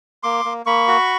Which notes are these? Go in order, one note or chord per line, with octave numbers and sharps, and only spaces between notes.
A#3 C6 D6
A#3
A#3 B5 C#6
F#4